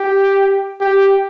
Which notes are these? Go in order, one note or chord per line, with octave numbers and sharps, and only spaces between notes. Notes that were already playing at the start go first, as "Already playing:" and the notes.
Already playing: G4
G4